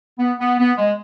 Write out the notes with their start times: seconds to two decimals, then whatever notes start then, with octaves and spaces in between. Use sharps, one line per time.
0.19 B3
0.39 B3
0.59 B3
0.78 G#3